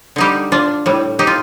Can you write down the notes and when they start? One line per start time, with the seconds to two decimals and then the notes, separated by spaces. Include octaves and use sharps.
0.16 D3 G3 D#4 G4
0.52 D4 F4
0.86 A2 G3
1.19 D#4 G4
1.27 F4